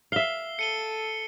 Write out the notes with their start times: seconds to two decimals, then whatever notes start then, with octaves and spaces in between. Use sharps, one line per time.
0.12 E5 F5 C7 G7
0.59 A4 C#7 D#7 G7